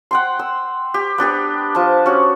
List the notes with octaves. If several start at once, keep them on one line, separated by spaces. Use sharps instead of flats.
F#5 G5 C6
E6
G4
B3 D4 G4 B4
F3 A5
C#4 F#4